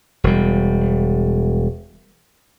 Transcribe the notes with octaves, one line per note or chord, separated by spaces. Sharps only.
E1 G3